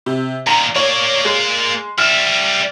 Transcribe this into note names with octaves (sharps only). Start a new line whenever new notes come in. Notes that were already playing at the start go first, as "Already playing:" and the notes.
C3
A#2 D#3 A#5
A#3 C#5 D5
G#3
G3 E5 F6